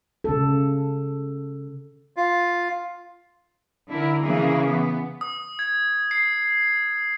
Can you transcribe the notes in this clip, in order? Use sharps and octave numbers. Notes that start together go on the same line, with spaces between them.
C#3 A4
F4
D3 E4 A#4
C#3 E3 A#3 G#4
B3
D#6
G#6
C7